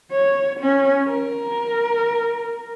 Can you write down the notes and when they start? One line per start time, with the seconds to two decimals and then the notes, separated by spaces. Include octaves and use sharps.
0.11 C#5
0.60 C#4
1.08 A#4